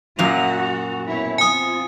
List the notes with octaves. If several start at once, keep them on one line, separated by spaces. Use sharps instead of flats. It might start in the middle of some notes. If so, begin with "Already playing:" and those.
F#2 A#2 F#4 F7
B2 E4 C#5
C4 F4 G#5 D#6